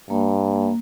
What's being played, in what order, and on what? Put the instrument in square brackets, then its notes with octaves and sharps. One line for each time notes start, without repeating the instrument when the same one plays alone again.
[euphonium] G2 [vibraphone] A#3